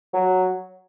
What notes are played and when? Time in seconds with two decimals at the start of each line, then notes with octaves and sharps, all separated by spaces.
0.14 F#3